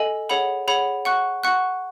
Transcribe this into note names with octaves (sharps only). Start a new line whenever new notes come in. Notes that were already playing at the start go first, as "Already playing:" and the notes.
Already playing: A4 D#5 G#5
G#4 C#5 F#5 B5
G#4 C#5 F#5 B5
F#5 C#6 F#6
F#5 C#6 F#6